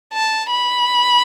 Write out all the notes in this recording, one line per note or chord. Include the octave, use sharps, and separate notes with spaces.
A5
B5